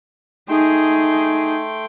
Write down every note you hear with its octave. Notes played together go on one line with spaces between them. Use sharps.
A3 D#4 G#4 G5 C6